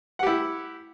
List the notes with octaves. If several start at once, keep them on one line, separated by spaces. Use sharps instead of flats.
E4 G4 F#5